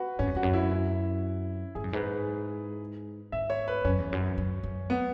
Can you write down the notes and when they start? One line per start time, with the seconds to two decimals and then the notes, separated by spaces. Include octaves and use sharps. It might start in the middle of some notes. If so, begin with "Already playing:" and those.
Already playing: F#4 B4
0.19 G#2 C#4
0.27 F#2
0.35 E2 F#4
0.43 F#2
0.53 E4
0.71 E4
1.75 G#2 G#4
1.84 F#2
1.93 G#2 B4
3.32 G#2 E5
3.50 C#5
3.68 B4
3.85 F#2 C#4
3.99 E2
4.12 F#2
4.38 F#2
4.63 F#2
4.90 B3